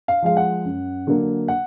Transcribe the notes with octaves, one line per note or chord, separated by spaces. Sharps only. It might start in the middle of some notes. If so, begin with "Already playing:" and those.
F5
F3 G#3 F5
F#5
F#2
D3 F#3 A#3
F#5